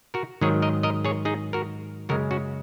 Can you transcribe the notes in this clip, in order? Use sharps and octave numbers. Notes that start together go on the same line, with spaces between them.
F#4 A#4
G#2 D#3 F#3 G#4 C#5
A#4 D#5
A#4 D#5
G#4 C#5
D#4 G#4
F#4 A#4
F#2 C#3 G#3 F#4 A#4
C#4 F#4